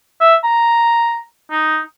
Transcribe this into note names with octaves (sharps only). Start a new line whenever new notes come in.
E5
A#5
D#4